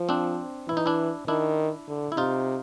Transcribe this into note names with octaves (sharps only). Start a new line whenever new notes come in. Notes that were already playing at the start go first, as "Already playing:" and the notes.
Already playing: F3
C4 D4
E3 E4
D#4
D4 E4
D#3 D4 E4
D3
E4
C3 D#4 F4